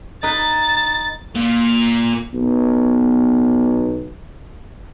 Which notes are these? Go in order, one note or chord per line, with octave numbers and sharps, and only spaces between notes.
D#4 B4 A6
A#2 A#3
B1 B3